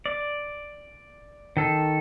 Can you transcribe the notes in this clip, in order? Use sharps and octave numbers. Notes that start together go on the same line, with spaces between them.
D5
D#3 A4